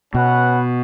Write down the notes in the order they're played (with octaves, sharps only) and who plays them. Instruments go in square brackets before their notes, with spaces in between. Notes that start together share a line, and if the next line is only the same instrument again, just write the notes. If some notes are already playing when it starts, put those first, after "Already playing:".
[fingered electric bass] B2 [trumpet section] C#4 F#4 B4 F#5